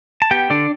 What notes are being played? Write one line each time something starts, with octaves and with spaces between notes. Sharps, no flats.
A5
B3 G4 G5
D3 D4 D5